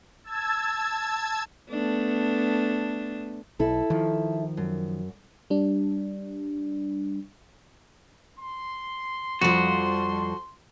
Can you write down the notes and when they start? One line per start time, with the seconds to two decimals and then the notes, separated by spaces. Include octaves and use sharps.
0.24 A5 E6 G#6
1.70 A3 B3 D4
3.60 B1 E4 A4
3.90 D#3 F3
4.57 F#2
5.50 G3 D4
8.38 C6
9.41 F2 F3 G3 F#4